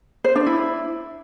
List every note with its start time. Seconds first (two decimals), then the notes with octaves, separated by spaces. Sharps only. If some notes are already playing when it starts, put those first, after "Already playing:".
0.24 C5
0.35 D4
0.47 E4